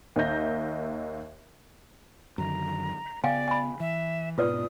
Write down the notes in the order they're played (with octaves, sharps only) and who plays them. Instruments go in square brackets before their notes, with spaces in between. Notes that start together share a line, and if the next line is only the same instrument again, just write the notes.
[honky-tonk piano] D#2 A#4 D#5 E5 G6 A#6
[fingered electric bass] F#2 D3 D#3 [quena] A#5
[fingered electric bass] C#3 B3 [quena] D5 [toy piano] F5 G5 G#5
[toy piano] G#5 B5
[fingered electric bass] E3 [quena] E5
[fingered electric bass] G#2 B2 [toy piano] F4 B4 D5 [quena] D#6